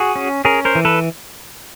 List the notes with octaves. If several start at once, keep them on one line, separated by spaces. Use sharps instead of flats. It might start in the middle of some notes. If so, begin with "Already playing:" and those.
Already playing: F#4 G#4
C#4
C#4 G#4 A#4
A#4 C5
E3
A4 B4